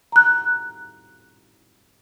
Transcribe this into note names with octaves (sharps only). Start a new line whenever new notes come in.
A#5 F#6